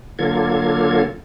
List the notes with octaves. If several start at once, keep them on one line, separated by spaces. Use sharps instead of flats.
D3 F#3 A#3 F4 A4 G#6